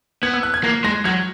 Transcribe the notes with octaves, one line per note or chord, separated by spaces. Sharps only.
B3 G#6
E6
F#6
G#6
A#3 A#6
G#3 A#6
F#3 G#6